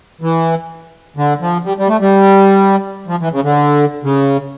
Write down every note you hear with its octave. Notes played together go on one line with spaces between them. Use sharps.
E3
D3
F3
G3
G3
A3
G3
F3
E3
C#3
D3
C#3